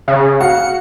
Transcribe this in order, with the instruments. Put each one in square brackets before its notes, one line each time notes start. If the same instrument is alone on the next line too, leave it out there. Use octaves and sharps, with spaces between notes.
[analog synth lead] C#3
[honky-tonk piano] F#4 F5 [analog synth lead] C#7